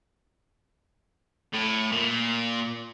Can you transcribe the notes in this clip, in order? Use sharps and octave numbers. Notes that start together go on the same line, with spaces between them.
A2
A#2